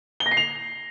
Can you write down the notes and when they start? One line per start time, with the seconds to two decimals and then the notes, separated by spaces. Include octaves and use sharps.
0.20 G7
0.26 A#6
0.31 C7
0.37 F7